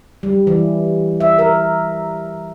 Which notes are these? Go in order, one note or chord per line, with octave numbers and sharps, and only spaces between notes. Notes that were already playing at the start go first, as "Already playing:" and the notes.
G3
E3
E5
A#4